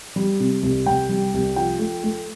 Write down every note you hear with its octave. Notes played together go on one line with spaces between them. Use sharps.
G3
C3
C2
C2 G5
G3
C2
F3 G5
A3
A3